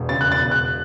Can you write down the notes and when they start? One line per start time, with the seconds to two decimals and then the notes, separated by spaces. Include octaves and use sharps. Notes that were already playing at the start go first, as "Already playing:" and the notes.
Already playing: E1 E2
0.09 C#3 A6
0.21 F#6
0.31 E1 A6
0.51 E1 F#6